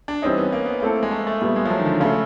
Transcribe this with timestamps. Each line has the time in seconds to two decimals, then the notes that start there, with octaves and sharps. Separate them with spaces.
0.08 D4
0.22 E3 G3 C4 C#4 D#4
0.38 B3
0.52 A#3
0.66 B3
0.80 A3 A#3 C4 E4 A4
1.03 G#3
1.11 A3
1.27 A3
1.41 A#2 G3 A3 B3
1.56 G#3
1.65 F3
1.70 F#3
1.79 D#3
1.86 D3
2.00 C#3 A3 C#4 F4